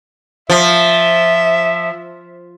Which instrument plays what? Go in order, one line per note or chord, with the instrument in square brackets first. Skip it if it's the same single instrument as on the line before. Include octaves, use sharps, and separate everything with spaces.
[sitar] F3 [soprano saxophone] E5